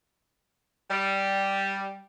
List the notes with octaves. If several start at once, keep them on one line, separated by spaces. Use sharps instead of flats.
G3